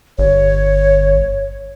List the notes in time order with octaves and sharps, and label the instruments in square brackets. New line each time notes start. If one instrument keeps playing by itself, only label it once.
[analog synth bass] G1 [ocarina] C#5